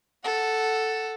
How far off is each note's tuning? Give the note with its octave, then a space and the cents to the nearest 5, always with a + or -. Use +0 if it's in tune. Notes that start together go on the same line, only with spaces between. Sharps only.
A4 +0 F#5 +10